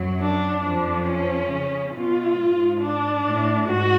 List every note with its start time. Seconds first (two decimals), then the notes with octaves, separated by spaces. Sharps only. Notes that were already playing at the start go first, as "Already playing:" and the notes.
Already playing: F#2 F#3
0.20 D4
0.63 F2 F3 D4
1.07 C#4
1.51 C#3
1.94 B2 F4
2.37 G#2
2.81 D4
3.25 A2
3.67 G#2 F#4